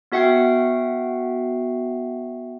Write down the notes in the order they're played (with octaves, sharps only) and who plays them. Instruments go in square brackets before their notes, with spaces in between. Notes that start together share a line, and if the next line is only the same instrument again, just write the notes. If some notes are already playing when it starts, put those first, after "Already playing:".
[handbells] B3 F#4 E5 F#5 G5 C7